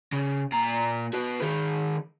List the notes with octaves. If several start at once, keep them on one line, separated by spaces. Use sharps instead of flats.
C#3
A#2 A#5
F#4 B4
D#3 G#4